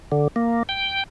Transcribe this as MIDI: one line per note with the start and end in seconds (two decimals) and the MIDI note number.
0.12 0.28 50
0.36 0.63 58
0.69 1.04 79